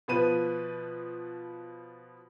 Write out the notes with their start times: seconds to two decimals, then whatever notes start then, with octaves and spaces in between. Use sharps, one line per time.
0.08 B2 F3 B4 D#7